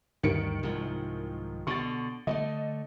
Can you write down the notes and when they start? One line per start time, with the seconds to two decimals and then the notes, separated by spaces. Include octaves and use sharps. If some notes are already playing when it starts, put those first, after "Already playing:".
0.23 D2 G2 D#3 C#7 D7
0.63 C2 G#2 F3
1.67 B2 D3 C#6 A6
2.27 D3 F3 A3 D#5